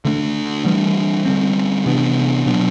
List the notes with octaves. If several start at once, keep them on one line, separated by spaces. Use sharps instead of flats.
D3 A3 D4
E3 G3 D4
D3 G3 C4
C3 E3 B3 D4
B2 F#3 B3 D4